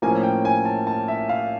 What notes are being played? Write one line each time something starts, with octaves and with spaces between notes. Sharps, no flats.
A2 F3 A#3 C#4 G#5
G5
G#5
A5
A5
E5
F5